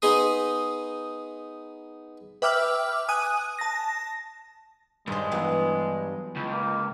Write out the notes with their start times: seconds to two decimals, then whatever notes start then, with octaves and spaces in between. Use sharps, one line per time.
0.02 B3 D#4 G#4 C6 D#6
2.42 B4 E5 G5 D6 E6 F6
3.08 G#5 D#6 F#6 D#7
3.59 A5 A#6
5.08 G2 D#3 G#3 C5
5.32 E3 F#3 B3
6.36 C#2
6.52 A#3